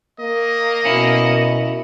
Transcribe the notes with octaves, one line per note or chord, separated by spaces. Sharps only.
A#3 D#5
B2 C#4 E4